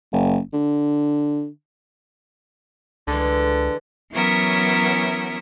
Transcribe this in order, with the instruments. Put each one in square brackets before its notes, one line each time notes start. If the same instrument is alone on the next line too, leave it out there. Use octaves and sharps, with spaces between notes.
[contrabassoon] F#1
D3
[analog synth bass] C#2 [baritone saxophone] D3 [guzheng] E3 G#3 A3
[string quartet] E3 F#3 B3 C#4 A#4 E5